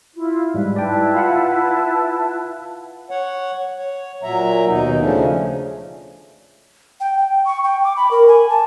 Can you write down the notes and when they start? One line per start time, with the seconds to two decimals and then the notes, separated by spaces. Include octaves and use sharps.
0.15 E4 F4
0.54 G#2 G3 G#3 B4
0.76 E4 B4 D5 G5 A5
1.14 F4 F5 F#5
3.11 C#5 F#5
3.78 C#5
4.23 A#2 F#3 E5 A#5
4.67 D#2 B2 D#4
5.01 C#3 F3 A3 C#4 D4
7.00 G5
7.18 G5
7.45 C#6
7.64 G5
7.84 D6
7.97 B5
8.11 A#4
8.28 G#5
8.49 A5